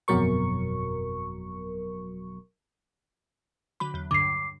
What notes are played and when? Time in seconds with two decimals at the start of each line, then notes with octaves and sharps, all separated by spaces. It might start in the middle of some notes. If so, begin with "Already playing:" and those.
0.08 G1 F2 B2 F#3 A#4 C#6
3.80 D3 F#3 B5
3.94 E2 F#3
4.11 C#2 G2 D3 D6 C7